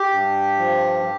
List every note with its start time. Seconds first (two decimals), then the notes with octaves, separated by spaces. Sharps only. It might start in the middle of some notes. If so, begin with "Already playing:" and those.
Already playing: G4
0.12 G2
0.58 F3